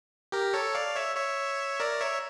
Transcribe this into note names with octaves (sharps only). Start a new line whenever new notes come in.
G4 A#4
A4 C#5
D5 F5
C#5 E5
C#5 E5
A#4 D5
C#5 E5